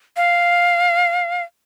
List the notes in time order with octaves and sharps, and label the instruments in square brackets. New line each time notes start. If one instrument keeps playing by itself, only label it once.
[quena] F5